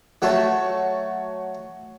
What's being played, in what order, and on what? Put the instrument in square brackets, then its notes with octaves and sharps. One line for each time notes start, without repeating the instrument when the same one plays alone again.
[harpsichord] F#3 A3 A4 [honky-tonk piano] F#4 C#5